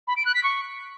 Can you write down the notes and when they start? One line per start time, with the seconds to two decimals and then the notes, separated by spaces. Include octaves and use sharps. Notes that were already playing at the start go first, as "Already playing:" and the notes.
0.08 B5
0.17 D7
0.26 F#6
0.35 B6
0.44 C#6